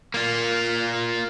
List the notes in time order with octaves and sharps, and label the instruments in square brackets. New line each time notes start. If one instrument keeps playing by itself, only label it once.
[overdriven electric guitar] A#3 F4